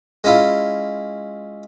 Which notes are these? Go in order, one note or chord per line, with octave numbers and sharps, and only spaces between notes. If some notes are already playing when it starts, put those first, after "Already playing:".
G#3 C#4 E4 F4